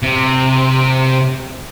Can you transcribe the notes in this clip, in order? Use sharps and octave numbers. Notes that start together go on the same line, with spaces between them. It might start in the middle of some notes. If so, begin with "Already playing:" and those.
C3